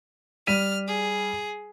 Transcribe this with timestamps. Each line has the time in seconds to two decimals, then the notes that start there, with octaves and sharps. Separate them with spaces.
0.47 G3 F6 B6 D#7
0.87 G#4